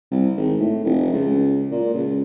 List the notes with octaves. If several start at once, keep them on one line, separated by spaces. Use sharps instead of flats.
C2
G#1
A2
F1
C#2
A#2
C#2